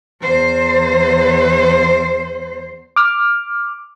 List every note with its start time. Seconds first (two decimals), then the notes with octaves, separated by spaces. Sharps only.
0.21 E2 C5
2.96 D6 F6